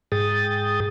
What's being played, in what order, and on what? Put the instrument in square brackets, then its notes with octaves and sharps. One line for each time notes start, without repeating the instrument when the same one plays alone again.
[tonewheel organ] G#2 G#4 G5 D#6 A6